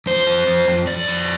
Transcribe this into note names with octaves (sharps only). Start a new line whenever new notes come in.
F2 C5
F2
F2
F2
F2 D5
F2